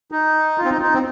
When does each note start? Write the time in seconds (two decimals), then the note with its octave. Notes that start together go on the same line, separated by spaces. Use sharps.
0.11 D#4
0.58 F4
0.65 C4
0.70 D#4
0.82 D#4
0.94 C4